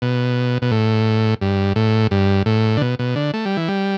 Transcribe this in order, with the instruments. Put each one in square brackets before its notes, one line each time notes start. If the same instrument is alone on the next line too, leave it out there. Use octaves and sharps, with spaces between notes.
[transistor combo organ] B2
B2
A2
G2
A2
G2
A2
D3
B2
B2
D3
A3
G3
E3
G3